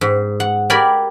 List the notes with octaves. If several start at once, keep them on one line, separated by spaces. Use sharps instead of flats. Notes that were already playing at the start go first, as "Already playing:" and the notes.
G#2
F#5
G4 A#4 D5 G#5 B5